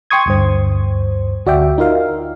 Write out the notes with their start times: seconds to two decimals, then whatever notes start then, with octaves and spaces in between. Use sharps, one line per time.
0.10 G5 C6 C#6 D#6 G#6
0.26 D2 G2 C5
1.46 D2 F#4 D5 E5 G5
1.78 D#4 F4 A#4 F5